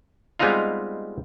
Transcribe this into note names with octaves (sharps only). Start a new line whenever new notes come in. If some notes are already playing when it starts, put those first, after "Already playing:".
G3 G#3 B3 C4 D#4 F4